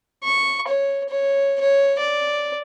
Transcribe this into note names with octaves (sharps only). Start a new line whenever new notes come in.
C#6
C#5
C#5
C#5
D5